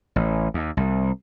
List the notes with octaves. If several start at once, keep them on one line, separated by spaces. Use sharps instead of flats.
A1
D#2
C2